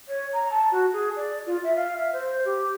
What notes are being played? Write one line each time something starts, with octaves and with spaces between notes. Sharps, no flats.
C#5
A#5
A5
F#4
G#4
D5
F4
E5
F5
E5
C5
G4